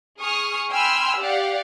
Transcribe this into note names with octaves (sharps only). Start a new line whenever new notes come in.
G#4 C#6 D#6 F6
G5 G#5 B5 C6 E6 F6
G4 D5 F5 F#5